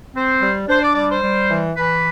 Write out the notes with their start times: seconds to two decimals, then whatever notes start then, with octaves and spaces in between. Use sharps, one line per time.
0.14 C4 C5
0.41 G3
0.68 D4 C5
0.82 D5
0.95 G3 D5
1.09 C5
1.22 G3
1.48 E3
1.76 E3 B4